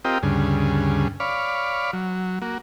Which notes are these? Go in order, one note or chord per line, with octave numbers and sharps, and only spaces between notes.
C4 F4 G4 A#4 D#5 G5
D2 G2 C#3 G#4
C#5 D5 F5 B5
F#3
A#3 F#4